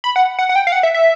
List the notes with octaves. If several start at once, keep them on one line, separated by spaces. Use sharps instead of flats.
B5
F#5
F#5
F#5
G5
F5
F#5
E5
E5